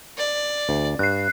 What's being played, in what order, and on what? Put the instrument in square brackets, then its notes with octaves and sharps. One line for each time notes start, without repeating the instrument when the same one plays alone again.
[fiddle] D5
[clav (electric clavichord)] D2
[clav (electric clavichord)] G2 [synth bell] F#6 C7